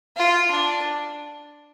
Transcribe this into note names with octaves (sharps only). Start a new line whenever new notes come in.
F4
D4